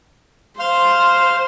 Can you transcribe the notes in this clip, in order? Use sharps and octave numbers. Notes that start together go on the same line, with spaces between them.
C5 F5 C6 F6